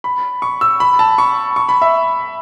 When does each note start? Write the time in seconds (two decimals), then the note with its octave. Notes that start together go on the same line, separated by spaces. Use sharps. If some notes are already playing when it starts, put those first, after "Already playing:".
0.04 B5
0.42 C#6
0.61 E6
0.80 B5
0.99 A5
1.18 C#6
1.56 C#6
1.69 B5
1.82 E5